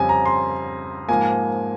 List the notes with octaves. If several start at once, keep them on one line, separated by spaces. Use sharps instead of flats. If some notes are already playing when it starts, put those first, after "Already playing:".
Already playing: F2 C#3 G3 C4 G#5
A#5
C6
G#2 F3 A#3 G#5